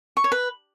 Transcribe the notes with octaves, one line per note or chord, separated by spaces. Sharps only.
C#6
C#5
B4